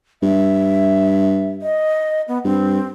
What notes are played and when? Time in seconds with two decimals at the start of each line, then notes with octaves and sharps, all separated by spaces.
0.23 G2 E5
1.62 D#5
2.28 B3
2.45 G2 C4